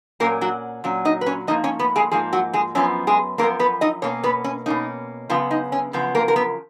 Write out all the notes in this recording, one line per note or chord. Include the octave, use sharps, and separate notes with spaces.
A#2 F#3 A#3 C#4 A#4
F#3 F#4
A#2 F#3 C#4
D#4 D#5
B4
C#4 C#5
G#2 F3 A#3 D#4 D#5
C#4 C#5
B3 B4
G#3 G#4
G#2 F3 A#3 G#4
F#3 F#4
G#3 G#4
F#2 F3 B3 C#4
G#3 G#4
F#2 F3 A#3 B3 A#4
B3 B4
D#4 D#5
B2 A#3 C#4 C#5
B3 B4
C#4
B2 A#3 C#4 D#4
F#2 C#3 F3 B3 F4
D#4
C#4
F#2 C#3 F3 B3
A#3 A#4
A#4
B3 B4